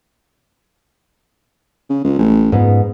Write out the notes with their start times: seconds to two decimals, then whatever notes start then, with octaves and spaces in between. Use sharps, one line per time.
1.90 C#3
2.04 C#2
2.19 A1
2.52 C#2 G#2 B3